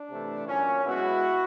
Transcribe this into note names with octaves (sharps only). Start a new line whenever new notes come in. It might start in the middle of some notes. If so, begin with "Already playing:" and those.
Already playing: D4
C3 E3 A3
A#2 F#3 A#3 C#4
B2 G#3 B3 E4 F#4